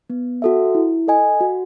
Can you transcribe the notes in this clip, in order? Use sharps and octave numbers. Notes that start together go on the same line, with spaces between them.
B3
F#4 A4 E5
E4
A4 D#5 G#5
F#4